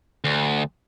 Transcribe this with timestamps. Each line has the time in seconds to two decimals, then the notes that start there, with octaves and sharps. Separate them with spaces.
0.24 D2